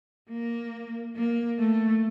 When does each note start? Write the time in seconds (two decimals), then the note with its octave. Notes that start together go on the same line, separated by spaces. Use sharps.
0.29 A#3
1.16 A#3
1.59 A3